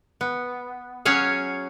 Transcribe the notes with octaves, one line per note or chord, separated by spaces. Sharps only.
B3
F#3 C#4 G#4 C#5 F5